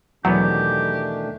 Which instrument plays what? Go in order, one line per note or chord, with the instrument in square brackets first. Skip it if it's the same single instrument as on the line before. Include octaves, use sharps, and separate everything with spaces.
[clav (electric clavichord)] E2 B2 B3 [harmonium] D#3 A3 D4 [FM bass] F#3 [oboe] G4